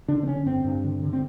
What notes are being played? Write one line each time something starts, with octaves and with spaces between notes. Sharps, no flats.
D3 D4
C4
D3 C#4
G2 C4
G2
D3
D3
C4